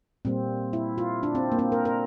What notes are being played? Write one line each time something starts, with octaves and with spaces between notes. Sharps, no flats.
A#2 G3 A#3 C4
E4
F4
D4
C4
A#3
C4
A#4
A#4